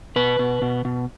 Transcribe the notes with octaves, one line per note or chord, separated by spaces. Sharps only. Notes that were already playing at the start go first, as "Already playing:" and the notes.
B2 B4
B2
B2
B2